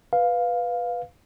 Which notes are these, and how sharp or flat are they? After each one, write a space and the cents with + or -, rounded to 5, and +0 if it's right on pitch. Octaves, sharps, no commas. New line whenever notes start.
B4 +0 F5 +5